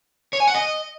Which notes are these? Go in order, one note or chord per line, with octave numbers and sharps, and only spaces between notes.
C#5
G#5
F#5
D#5